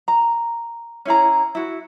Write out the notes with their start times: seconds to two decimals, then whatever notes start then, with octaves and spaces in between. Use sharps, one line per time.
0.08 A#5
1.05 C#4 E4 G#4 A#5
1.55 E4 F#4